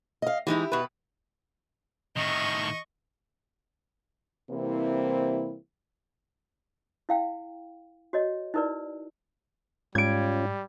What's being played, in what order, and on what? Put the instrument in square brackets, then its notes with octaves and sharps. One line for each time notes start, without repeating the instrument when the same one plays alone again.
[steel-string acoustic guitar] D#5 F5
[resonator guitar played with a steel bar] E3 G#3 D#4 [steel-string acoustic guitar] E4 G4
[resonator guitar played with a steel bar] B2 B4
[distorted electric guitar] A2 D#3 [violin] D#5 C#6
[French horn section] C3 E3 G3 A#3 C4 E4
[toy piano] E4 F5 G5
F#4 C#5 D#5
D#4 E4 A#4 B4 D5
[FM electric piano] G#2 [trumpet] G3 [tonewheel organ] C#4 F4 [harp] G#6 D7